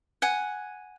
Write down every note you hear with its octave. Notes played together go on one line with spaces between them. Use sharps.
F#5 G#5